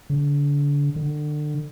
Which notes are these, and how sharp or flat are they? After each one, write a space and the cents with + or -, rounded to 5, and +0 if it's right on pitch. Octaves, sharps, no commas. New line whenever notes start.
D3 -35
D3 +30